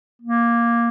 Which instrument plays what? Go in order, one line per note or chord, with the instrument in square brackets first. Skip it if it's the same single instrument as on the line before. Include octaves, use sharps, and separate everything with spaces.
[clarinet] A#3